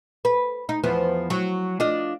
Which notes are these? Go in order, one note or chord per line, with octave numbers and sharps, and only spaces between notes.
B4
D#4
E2 F3 B3
F#3
D4 F4 D#5